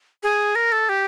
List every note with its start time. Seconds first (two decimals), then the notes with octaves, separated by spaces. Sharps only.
0.23 G#4
0.55 A#4
0.72 A4
0.89 G4